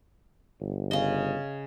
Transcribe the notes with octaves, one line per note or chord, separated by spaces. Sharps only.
G1
C#3 D#5